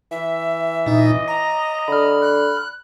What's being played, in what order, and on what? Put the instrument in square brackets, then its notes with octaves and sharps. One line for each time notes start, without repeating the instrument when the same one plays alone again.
[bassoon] E3 [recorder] E5
[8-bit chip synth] A#2 D#4 [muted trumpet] D#5
[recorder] A#5 [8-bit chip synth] A#6
[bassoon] D3 [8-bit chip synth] B5 F6
[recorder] F#6